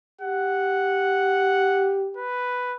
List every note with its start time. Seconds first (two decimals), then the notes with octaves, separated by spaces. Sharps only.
0.21 G4 F#5
2.17 B4